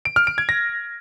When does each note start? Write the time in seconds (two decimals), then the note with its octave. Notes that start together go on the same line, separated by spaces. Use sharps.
0.05 D7
0.16 F6
0.27 D7
0.38 G#6
0.49 A#6